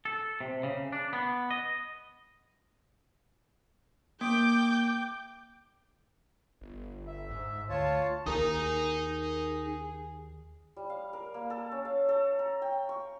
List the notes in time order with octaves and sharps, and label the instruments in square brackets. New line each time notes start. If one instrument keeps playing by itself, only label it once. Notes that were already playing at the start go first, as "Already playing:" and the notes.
[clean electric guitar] A4
C3
C#3
D4
B3
D#5
[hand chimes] A#3 [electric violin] G5 [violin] D6 G6
[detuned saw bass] G1
[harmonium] E5
[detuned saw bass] G#2
[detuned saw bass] D2 [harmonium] F4 C#5 A5
[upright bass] D#2 [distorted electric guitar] D#4 A#5 [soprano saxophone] G#4 [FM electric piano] A#4 D#6
[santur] G3
F5
A#4
A#3
A4
C#4
F5
A4
A#5
G5
C#6